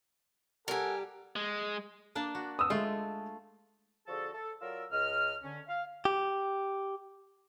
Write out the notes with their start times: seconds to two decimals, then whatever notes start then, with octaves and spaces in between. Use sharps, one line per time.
0.68 G3 G4 A4 A#4 F#5 G#5
1.36 G#3
2.15 A#3 D4 A5
2.35 F#4
2.59 D#6 E6
2.70 G#3 A3 F4
4.07 D3 F3 F#4 G#4 A4
4.33 A4
4.60 F#3 F4 A#4 D5 E6
4.91 C#2 D#5 F6
5.44 D3 C#4
5.67 F5
6.05 G4